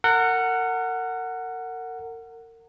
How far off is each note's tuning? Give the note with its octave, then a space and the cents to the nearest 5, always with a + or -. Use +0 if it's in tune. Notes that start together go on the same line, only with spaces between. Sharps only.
A#4 -35 F#5 +0